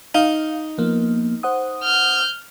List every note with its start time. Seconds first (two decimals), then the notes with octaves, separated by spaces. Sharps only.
0.15 D#4 F5
0.78 F3 A#3 B3
1.43 C5 F#5 D#6
1.83 F6 G6